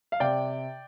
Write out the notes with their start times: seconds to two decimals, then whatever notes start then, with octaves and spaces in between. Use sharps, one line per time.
0.12 F5
0.20 C3 D5 G5